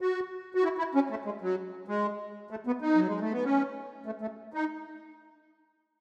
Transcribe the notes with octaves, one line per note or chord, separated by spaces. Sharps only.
F#4
F#4
E4
E4
C#4
A3
G#3
F#3
G#3
A3
B3
D#4
F#3
G#3
A3
B3
C#4
A3
A3
D#4